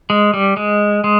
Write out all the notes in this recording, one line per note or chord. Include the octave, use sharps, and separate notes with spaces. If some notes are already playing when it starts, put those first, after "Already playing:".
G#3
G3
G#3
G#3